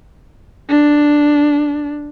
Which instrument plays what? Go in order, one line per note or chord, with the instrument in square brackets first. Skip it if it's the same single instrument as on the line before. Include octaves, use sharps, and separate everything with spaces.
[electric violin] D4